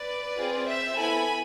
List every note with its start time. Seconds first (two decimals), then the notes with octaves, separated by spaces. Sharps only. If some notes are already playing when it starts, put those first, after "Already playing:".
Already playing: B4 D5
0.37 C4 F4 G#4
0.67 C5 E5
0.97 B3 E4 A4 G#5 B5